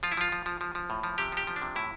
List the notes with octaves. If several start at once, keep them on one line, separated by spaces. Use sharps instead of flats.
F3 F4
E4
F3 F4
F3
F3
F3
F3
A2
F3
C3 G4
F3 G4
F3
D4
C3
A2 E4